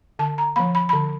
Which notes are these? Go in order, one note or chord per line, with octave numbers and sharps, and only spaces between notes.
D3 A5
A#5
F3 A#3 B5
B5
D3 B5